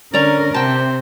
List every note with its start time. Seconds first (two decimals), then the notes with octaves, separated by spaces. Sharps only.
0.14 D3 C#4 A#4 D5 A#5
0.54 C3 C5 G5 A5